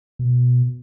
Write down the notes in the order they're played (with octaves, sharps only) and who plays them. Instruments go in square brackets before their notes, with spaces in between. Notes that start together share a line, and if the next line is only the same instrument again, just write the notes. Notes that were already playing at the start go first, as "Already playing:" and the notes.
[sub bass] B2